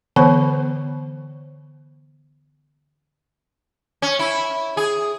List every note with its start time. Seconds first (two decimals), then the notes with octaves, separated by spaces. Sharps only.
0.16 D3 E3 B3 C5 C#5 C#6
4.02 C#4
4.19 E4
4.77 G#4